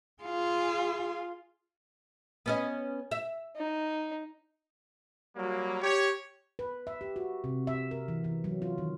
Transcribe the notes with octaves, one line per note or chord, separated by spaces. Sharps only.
F4 G#4
B3 C#4 D#5
E5
D#4
F#3 G3 A#3
G4 C#5
B4
E5
G4
F#4
C3
E5
A#4
E3
E3
F#3
F4
D#3